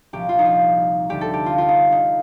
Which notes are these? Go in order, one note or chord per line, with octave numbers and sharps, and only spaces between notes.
C2 A#2 F3 G4
F4
D#4
F4
D2 D3 G3 G4
A4
G4
F4
F4
D#4
D#4